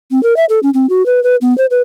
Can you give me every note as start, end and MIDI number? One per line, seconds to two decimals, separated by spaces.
0.11 0.22 60
0.23 0.36 70
0.36 0.45 76
0.49 0.59 69
0.63 0.70 61
0.74 0.89 60
0.89 1.05 66
1.06 1.22 71
1.23 1.36 71
1.41 1.56 59
1.58 1.66 72
1.71 1.81 71